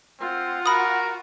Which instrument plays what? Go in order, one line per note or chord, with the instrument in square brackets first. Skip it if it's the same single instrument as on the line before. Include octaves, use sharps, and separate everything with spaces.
[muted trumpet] C4 [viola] F4 F#5
[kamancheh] F#4 [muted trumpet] A#4 [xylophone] B5 D#6